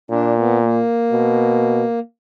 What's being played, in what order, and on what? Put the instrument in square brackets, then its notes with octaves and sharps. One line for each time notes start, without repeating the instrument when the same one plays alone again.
[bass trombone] A#2 [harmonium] D4
[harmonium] B3
A#3
[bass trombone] B2